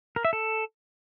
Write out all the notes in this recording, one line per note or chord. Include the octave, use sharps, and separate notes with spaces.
A#4
E5
A4